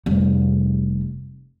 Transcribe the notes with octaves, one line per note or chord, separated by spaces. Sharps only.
F1 G3